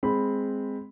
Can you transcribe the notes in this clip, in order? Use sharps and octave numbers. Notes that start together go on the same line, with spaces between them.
G#3 C4 B5